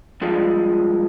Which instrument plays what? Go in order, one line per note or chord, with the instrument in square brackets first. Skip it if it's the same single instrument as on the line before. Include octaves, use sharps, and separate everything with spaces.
[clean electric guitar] G2 F3 G#3 D4